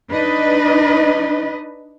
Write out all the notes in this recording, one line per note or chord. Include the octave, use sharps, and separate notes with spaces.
D4 D#4 B4 D#5